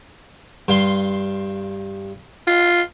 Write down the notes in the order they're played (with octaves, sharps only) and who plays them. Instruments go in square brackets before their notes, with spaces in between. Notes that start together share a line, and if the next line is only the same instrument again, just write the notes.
[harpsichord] G2 F5 C6
[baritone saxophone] F4